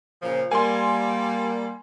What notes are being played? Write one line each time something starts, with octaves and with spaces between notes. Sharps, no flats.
A#2 C#3 F3
G3 A#3 G#5 C6